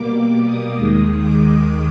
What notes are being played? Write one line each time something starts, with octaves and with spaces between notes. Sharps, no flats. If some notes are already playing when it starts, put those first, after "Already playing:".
Already playing: B2 G3 A#3 D6
D6
D#6
D#2 D#3 G#3 D#6
D6